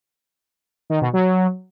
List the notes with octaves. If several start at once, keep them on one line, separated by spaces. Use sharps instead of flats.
D#3
B2
F#3